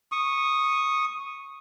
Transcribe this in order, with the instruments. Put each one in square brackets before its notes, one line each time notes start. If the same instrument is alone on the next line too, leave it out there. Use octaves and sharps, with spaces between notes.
[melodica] C#6 D#6